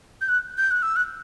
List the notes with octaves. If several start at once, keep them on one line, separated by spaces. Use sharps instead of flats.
G6
F#6
G6
F#6
E6
F#6